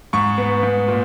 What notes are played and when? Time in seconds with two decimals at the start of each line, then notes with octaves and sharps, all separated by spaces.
0.13 G#2 C#6
0.38 B3
0.63 G#2
0.88 A#2